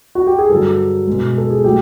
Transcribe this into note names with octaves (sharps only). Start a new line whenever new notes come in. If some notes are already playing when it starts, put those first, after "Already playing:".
F#4
G4
G#4
G2 D3 F#3 A4
B2 G#3
A4
G#4
F#3 A3 G4